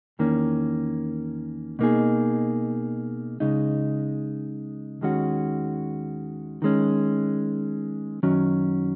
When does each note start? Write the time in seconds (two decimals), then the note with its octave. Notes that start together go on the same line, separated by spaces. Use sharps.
0.19 E2 D#3 A#3 C#4
1.79 B2 A#3 D#4 G#4
3.40 C#2 C#3 G#3 D#4
5.01 D#2 D#3 G#3 C#4 F#4
6.62 D#3 G#3 C#4
8.23 F#2 D#3 F#3 C#4